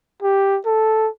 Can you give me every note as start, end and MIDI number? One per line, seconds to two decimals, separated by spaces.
0.22 0.59 67
0.66 1.08 69